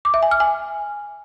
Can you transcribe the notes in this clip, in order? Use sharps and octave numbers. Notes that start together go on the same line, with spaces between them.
D6
E5
G#5
F6
G#5